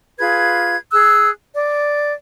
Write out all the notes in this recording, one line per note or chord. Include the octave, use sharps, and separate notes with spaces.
F4 G#4 B4 G#6
G#4 E6 F#6
D5